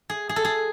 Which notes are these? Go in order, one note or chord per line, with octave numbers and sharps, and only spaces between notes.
G#4
G#4
A4
G#4